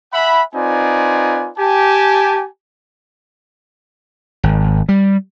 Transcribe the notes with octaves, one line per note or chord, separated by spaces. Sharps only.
E5 F#5 G#5 B5
C4 D#4 F4 B4 D5 G#5
G4 G#5 A5
G#1
G3